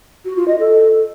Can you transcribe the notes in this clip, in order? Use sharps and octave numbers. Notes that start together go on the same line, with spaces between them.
F#4
F4
D#5
A4